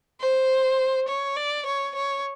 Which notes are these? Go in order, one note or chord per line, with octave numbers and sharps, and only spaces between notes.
C5
C#5
D5
C#5
C#5